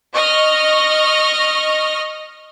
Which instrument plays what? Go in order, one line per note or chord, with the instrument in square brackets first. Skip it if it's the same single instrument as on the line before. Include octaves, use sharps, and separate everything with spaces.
[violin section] D#5 C#6 F6 A#6